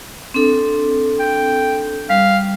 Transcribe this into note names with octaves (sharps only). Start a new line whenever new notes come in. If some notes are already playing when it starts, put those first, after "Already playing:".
C4 D4 A4
G5
G3 F5